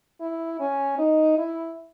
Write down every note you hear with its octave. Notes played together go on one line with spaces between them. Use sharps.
E4
C#4
D#4
E4